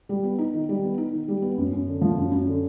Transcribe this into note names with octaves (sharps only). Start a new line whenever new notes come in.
G3
B3
D#4
D#3
G3
B3
D#4
D#3
G3
B3
F#2
F#2
D3
F3
F#2
F#2
D3